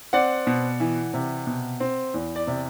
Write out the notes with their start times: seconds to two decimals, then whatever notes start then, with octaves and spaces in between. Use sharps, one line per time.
0.13 C4 D5 F#5
0.47 B2
0.80 E3
1.14 C3
1.47 B2
1.80 C4
2.14 E2
2.36 D5
2.47 C3